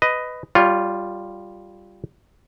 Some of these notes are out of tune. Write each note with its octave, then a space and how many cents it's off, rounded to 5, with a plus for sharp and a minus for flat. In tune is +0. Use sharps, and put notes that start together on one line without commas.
B4 +15 D#5 +0
G3 +0 F4 +0 C#5 +35